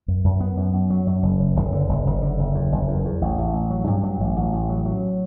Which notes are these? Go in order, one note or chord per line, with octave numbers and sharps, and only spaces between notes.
F#2
F#2
B3
F#2
F#2
F#3
F#2
F#1
F#1
F#1
D3
F#1
F#1
D3
F#1
E2
F#1
E2
E2
A1
A1
A1
F#3
G2
F#3
A1
A1
A1
F#3
F#3